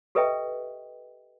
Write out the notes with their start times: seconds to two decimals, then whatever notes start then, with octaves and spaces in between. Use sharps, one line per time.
0.15 G4 A4 B4 D#5 E5 G5